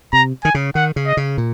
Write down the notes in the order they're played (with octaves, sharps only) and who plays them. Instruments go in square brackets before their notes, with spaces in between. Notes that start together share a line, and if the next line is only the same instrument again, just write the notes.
[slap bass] C3 [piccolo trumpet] A#5
[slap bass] D#3 [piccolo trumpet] G#5
[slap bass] C#3
[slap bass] D#3 [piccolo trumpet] F#5
[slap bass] C#3
[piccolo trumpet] D#5
[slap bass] C#3
A#2